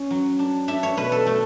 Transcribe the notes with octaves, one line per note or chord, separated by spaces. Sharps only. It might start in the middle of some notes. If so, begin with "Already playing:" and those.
Already playing: C#4
F#3
D4
D4 E5
C#5
B2 B4
A4
A3